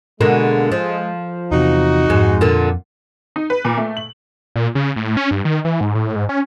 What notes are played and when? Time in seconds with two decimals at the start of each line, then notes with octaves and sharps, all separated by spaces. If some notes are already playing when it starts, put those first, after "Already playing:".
0.21 B2 D3 G#3 A#3
0.72 F3
1.52 E2 C3 D#4 F#4
2.10 F2 G#2
2.41 A#2 D3
3.36 D#4
3.50 B4
3.65 A#2
3.77 A3
3.97 F#7
4.56 A#2
4.75 C#3
4.96 A2
5.17 C#4
5.31 G2
5.45 D#3
5.65 E3
5.81 G#2
5.95 A2
6.16 G#2
6.29 C#4